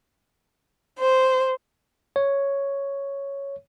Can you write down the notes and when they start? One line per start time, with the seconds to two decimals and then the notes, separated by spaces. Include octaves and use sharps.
1.00 C5
2.16 C#5